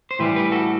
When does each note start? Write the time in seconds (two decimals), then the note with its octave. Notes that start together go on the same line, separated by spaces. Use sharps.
0.11 C5
0.19 A2 E3 G3 G4 B4
0.36 G4 B4
0.52 F#4 A4